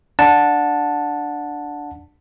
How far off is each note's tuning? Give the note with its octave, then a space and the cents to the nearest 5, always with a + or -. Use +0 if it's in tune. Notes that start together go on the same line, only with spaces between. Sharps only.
D4 +0 F#5 -20 A5 +0